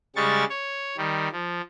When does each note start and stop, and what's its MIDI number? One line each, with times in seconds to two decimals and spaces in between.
0.16 0.44 49
0.16 0.44 55
0.16 0.44 56
0.16 0.44 85
0.16 0.44 93
0.50 0.97 73
0.97 1.28 51
0.97 1.28 55
1.32 1.61 53